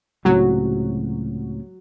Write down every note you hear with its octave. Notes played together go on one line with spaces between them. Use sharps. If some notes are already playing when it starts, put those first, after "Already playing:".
C#2 A2 C3 F#3